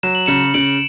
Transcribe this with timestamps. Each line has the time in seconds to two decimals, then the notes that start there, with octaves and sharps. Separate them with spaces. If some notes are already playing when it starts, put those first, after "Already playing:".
0.03 F#3 E7
0.15 F#7
0.26 C#3 C#7 E7
0.54 C#3 D7 F#7